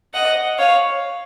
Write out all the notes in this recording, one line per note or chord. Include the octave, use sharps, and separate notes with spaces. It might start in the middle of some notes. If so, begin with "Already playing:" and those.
D#5 F#5
C#5 F5